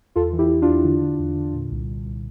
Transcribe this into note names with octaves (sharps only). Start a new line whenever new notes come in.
E2 F4 A4
E3
E4 G4
E3
D4 F4
E2
D3
D3
E2
D3
A#2
C2
C2
C2